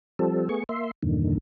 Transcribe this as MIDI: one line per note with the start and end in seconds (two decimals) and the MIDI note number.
0.19 0.48 53
0.19 0.48 55
0.19 0.48 60
0.19 0.48 69
0.49 0.64 57
0.49 0.64 59
0.49 0.64 68
0.49 0.64 85
0.69 0.91 58
0.69 0.91 76
0.69 0.91 84
1.03 1.38 40
1.03 1.38 43
1.03 1.38 46
1.03 1.38 50
1.03 1.38 51